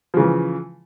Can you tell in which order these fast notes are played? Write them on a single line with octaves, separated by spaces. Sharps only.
F3 C#3 E3